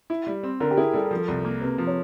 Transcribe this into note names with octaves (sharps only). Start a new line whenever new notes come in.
E4
G3
C4
D3 A#4
G4
E4 G#4
G3 A4
A#4
F3
A4
C2
A#3
C3 B4
F3
C#5